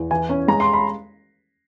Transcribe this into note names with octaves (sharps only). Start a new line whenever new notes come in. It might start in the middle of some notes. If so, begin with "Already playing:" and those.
Already playing: E2
E3 G#5
C#4
G#3 A#5
C6
B5